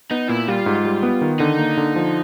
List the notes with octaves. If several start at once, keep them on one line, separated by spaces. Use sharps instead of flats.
B3 D#4
A#2 E4
G3 F4
G#2
G3
B3
D#3
D3 D#4
A#3
D3
F3